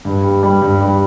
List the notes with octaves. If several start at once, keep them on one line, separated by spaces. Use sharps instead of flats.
G2
G3
G3
G2
G3